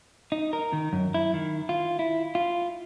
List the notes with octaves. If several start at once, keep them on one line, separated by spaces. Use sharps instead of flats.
D#4
A#4
D#3
F#2
E4
D#3
F4
E4
F4